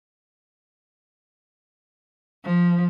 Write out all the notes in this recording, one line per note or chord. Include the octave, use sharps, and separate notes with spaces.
F3